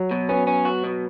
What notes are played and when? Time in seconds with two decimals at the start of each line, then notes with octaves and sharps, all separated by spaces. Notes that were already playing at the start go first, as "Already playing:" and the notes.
Already playing: F#3
0.11 B2
0.29 B3 C#4
0.47 C#4
0.65 F#4
0.84 B2